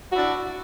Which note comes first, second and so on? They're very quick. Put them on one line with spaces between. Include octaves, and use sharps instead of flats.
F#4 E4 D4